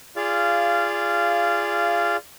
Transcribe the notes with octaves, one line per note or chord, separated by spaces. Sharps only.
F4 G#4 D5 F5